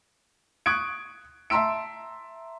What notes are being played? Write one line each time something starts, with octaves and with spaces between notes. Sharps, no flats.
C#6 D#6 F#6 G#6 D7
E5 A5 A#5 C6 E6 D7